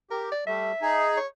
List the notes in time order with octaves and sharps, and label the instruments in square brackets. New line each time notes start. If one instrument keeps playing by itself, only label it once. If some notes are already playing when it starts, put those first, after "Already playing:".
[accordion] G4 [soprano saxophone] A#4
[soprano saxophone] D5
[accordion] G3 A3 [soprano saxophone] E5
[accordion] D#4 G#4
[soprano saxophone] C#5